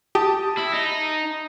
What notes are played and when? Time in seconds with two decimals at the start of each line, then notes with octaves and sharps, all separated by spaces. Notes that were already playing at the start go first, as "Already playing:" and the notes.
0.15 G4 A5 D#6
0.58 E4
0.74 D#4